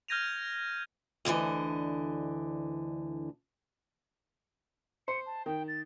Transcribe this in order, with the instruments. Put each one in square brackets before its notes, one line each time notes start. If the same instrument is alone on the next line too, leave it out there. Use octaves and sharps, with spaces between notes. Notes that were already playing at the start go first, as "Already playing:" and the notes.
[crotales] F6 G6 G#6 A#6 D#7 F7
[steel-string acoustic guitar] D2 B2 D3 E3 D#5
[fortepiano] C5 [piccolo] C#7
[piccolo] A5
[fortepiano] D#3 [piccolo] G5
[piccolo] A6